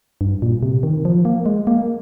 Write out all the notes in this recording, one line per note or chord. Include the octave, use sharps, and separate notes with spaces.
G2
A#2
C3
D#3
F3
A#3
G#3
A#3